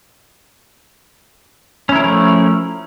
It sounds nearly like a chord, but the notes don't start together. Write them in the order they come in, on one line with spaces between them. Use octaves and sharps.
C#4 E4 A#4 F3 A3